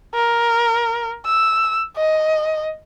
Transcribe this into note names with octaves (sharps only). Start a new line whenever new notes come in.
A#4
E6
D#5